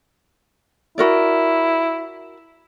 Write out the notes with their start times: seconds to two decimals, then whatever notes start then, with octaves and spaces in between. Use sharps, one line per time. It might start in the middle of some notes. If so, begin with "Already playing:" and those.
0.98 E4 F#4 A#4 D5